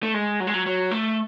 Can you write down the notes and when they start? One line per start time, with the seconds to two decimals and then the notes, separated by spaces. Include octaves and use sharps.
0.03 A3
0.14 G#3
0.40 F#3
0.47 G#3
0.54 F#3
0.66 F#3
0.91 A3